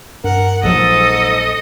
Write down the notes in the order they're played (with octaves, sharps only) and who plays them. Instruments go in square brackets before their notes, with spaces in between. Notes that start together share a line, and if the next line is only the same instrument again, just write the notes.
[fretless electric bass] G2 [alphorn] A#4 [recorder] F#5
[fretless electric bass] A#1 F3 F#3 [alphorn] G#2 [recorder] A4 [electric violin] D#5